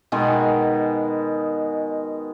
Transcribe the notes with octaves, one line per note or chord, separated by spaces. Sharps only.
B2 D#3 G#3 G#5